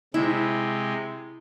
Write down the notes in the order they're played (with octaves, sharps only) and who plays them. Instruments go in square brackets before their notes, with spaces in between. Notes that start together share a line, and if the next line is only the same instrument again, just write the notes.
[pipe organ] C3 G#3 [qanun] E4